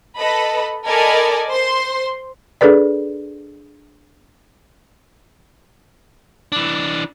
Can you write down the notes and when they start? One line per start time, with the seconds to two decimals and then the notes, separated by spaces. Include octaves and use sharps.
0.17 A4 B4 D#5 B5
0.86 A4 A#4 D5 D#5 G#5 B5
1.48 C5 C6
2.61 D4 G#4 A4 B4 D5
6.52 E3 D4